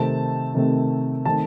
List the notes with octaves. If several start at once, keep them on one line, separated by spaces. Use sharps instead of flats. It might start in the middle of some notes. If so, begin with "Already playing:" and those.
Already playing: C3 D#3 A3 C4 A5
C3 D#3 A3 C4
D#3 A3 C4 A5